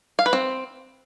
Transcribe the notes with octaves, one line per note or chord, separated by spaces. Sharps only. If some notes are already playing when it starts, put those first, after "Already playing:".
F5
B4
C4